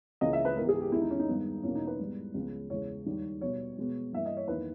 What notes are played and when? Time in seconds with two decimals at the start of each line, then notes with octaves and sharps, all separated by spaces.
0.21 C#2 C#3 E3 A#3 D#5
0.33 E5
0.45 B4
0.57 G#2 E3 G#3 B3 A#4
0.65 G4
0.69 G#4
0.81 G4
0.92 E2 D#3 G#3 B3 E4
1.01 D#4
1.11 C#4
1.19 D#4
1.28 G2 D#3 G#3 B3
1.63 E2 B2 A#3 C#4
1.75 D#4
1.87 B4
1.99 G#2 G3 B3
2.34 C#2 C#3 G#3 B3
2.70 E2 C#3 G#3 C#5
3.06 D#2 D#3 G3
3.41 B2 G3 B3 C#5
3.77 B2 G#3 B3
4.13 G2 E3 A#3 E5
4.26 D#5
4.37 C#5
4.48 E2 D#3 A#3 B4